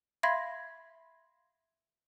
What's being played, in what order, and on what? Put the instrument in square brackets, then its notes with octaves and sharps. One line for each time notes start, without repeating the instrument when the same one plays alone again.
[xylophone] E5 F5 B5 C6 G#6 A#6